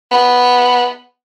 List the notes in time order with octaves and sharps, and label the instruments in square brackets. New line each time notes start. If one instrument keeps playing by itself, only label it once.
[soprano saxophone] B3